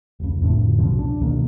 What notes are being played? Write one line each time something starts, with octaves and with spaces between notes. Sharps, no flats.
F1 C#2
F2 A2 D3
C2 F#2 B2 F3
D4
C#2 B2 D#3 A#3